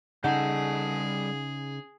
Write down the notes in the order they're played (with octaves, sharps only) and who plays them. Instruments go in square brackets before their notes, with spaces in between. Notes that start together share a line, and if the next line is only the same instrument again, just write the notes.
[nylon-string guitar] C#3 D#4 [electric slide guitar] G3 A4 A5 [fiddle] G#4 [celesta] F#5 G6